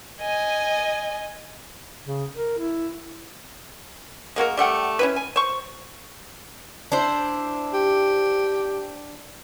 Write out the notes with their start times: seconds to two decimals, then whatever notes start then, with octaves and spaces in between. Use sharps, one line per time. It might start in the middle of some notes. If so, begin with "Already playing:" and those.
0.21 D#5 G#5
2.04 C#3
2.34 A#4
2.58 E4
4.36 G#3 A#3 F#4 A#4
4.57 G3 A3 F#5 G5
4.99 C#4 E4 B4
5.16 G#5
5.36 C5 C#6
6.92 D4 E4 C5
7.74 G4